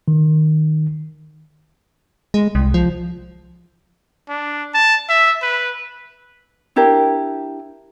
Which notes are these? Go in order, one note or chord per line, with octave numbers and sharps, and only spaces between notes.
D#3
G#3
C2
F3
D4
A5
E5
B4
D4 E4 G4 A#4